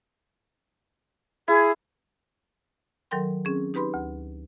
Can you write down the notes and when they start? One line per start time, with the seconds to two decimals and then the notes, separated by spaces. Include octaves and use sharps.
1.48 E4 G#4
3.11 D#3 F#3 A4 A#4 G5 C6
3.45 C4 C#4 G#4
3.74 D#4 G4 B4 B5 C6
3.94 D2